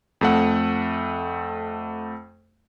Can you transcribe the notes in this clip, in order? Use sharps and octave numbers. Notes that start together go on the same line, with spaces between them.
F2 A3 F#5